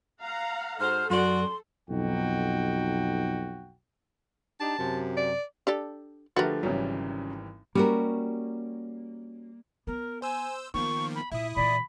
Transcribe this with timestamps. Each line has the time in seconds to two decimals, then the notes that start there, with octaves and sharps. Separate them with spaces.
0.23 F5 F#5 A#5
0.80 G#2 F#4 A4 C5 F6
1.10 F#2 F#4 D5 C6
1.89 B1 F2 B2 D#4 F#4 G5
4.61 D4 D#4 G4 A5
4.79 F#2 C3
5.17 D5
5.67 D4 G4 A4
6.36 D3 F3 A3 F#4 G4 A#4 B4 A6
6.63 G#1 C#3 E3 F#3 G3
7.75 G3 A#3 C#4 F#4 A#4
9.87 B3 A#4
10.22 C5 G#5 E6
10.74 D#3 F3 A#3 B3 C#6
11.15 B5
11.32 A#2 E4 E5 D#6
11.56 A#2 E3 D5 B5